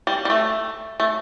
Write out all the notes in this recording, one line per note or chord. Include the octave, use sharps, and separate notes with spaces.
G3
G3
A3
A3